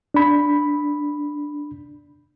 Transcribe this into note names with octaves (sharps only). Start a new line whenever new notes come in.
D4 B5